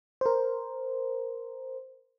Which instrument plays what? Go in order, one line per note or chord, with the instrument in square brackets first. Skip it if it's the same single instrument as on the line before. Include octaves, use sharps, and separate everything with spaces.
[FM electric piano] A#4 C5